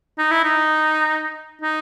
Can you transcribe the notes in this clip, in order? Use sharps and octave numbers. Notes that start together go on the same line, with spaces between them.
D#4
E4
D#4
D#4